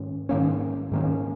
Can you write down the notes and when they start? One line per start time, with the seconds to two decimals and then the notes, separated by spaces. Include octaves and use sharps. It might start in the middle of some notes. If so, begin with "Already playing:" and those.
Already playing: G#2 D#3 C#4
0.29 G#2 D#3 A#3 C#4
0.92 G#2 D#3 A#3 C#4